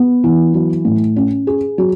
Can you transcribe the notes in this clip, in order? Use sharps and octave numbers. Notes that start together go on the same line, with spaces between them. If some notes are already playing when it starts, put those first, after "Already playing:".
Already playing: B3
E3
F#3
A2
C#4
G#4
F#3